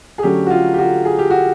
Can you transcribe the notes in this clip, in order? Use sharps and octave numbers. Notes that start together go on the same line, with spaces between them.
G#4
D3 F#3 A3 C#4 G4
F#4
F4
G4
F#4
G#4
G4
F#4